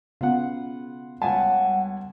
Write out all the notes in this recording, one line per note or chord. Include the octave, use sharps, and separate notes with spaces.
C#3 B3 F4 F#5
C#2 G3 F#5 G#5 A5